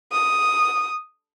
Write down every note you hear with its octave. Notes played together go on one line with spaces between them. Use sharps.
D#6